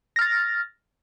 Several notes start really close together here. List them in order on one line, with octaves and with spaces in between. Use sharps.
A#6 F6 A6